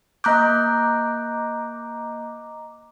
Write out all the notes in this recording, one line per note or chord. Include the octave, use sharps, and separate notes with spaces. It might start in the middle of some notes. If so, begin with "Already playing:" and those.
A#3 D#5 A#5 D6 F#6 G6